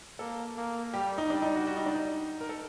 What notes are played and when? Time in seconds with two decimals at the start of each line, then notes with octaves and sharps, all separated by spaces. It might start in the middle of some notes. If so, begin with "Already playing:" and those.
0.19 A#3 A4
0.57 A#3
0.94 G3 G4
1.18 D#4
1.30 G3 D4
1.42 D#4
1.56 F#4
1.67 F#4
1.77 D#4
1.86 D4
1.95 D#4
2.41 A#4
2.49 A4